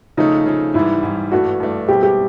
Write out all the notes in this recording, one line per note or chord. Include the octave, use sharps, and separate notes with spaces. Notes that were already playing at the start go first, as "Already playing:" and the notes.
C#3 F3 A3 D#4
C#3 F3 A3
G#2 E3 G3 E4
G#2 E3 G3
G2 E3 A3 D4 F#4
G2 E3 A3 D4
B2 G3 C4 E4 G4
G4